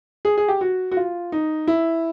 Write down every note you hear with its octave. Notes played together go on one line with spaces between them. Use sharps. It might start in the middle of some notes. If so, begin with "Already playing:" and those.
G#4
G#4
G4
F#4
F#4
F4
D#4
E4